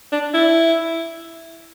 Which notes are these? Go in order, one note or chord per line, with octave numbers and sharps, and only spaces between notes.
D4
E4